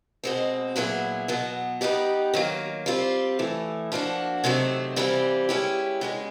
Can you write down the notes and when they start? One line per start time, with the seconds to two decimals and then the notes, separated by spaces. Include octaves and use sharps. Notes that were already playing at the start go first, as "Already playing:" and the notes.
0.23 B2 G#3 C4
0.76 A#2 F#3 B3 E4 G#4
1.28 B2 F#3 B3
1.81 G3 B3 D#4 G4
2.34 D#3 F#3 A#3
2.86 G3 C4 F4
3.39 A2 E3 A3
3.92 F3 A#3 D4 F#4
4.44 C3 D#3 F#3 A3 C4
4.96 C3 E3 G3 C4 F4
5.49 G#3 C#4 E4 G4
6.01 B2 G#3 C#4